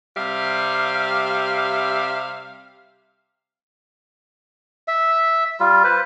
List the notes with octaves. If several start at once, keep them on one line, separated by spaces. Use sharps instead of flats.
C3 G3 E5 F5
E5
G3 F4
B4 C5